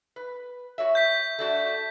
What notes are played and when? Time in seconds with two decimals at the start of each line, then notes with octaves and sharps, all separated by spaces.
0.16 B4
0.78 F#4 C#5 E5
0.95 G6 B6
1.39 A3 D4 F#4